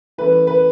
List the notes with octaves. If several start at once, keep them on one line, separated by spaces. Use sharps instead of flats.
E3 A3 C#4 B4
B4